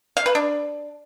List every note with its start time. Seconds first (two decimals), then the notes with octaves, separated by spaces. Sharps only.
0.17 F5
0.26 B4
0.35 D4